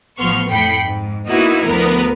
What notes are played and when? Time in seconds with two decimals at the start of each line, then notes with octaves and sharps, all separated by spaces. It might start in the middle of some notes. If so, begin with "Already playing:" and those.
0.18 A1 F3 B3 C6 C#6 F6
0.49 F2 A2 G5 B5 C7 C#7
0.82 G#2
1.26 A#3 B3 D#4 E4 F#4 B4
1.64 D2 F3 B3 A#4 B4